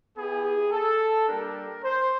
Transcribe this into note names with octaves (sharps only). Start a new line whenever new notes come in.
B3 E4 G4 G#4
A4
G3 A#3 D4 G4 A#4
C5